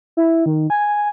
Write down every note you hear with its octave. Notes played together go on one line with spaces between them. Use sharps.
E4
D#3
G#5